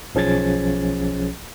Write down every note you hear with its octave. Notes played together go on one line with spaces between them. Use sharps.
B1 F3 C#4 G#4 G#6 A6